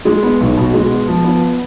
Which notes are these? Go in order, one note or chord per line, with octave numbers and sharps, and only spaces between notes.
G#3
B3
B1
B2
G#3
B3
F3
B3